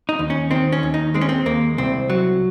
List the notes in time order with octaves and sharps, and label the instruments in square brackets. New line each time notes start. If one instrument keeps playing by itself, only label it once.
[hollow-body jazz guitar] D#4
D#2
C#4
D#3 C4
C#4
D#2
D#4
G#3 C4
C#4
C4
D#2 A#3
C2 C4
F#3